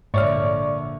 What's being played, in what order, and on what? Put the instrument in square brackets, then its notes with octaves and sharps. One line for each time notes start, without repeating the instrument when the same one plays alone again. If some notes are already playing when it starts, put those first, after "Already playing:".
[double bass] A#1 D3 [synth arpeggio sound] G#2 C#5 F6 [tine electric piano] D5 E5 C#6